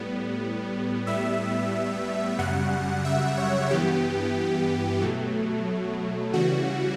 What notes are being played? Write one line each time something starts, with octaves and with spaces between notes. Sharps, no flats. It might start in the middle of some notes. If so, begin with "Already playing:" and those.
Already playing: A2 G3 B3
A2 G3 B3 E5
F#2 C#3 G3 F#5
E5
C#5
G2 E3 B3 G4
B2 F#3 A3
C#3 E3 G3 F#4